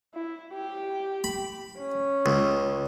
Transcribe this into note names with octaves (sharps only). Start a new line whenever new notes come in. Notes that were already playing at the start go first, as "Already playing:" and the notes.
E4
G4
B5
C#4
C#2